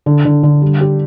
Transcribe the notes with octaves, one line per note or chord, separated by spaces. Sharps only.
D3
D3
D3
G3
G4